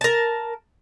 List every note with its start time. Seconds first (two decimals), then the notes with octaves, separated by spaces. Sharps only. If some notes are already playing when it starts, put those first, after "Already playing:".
0.01 A#4 A5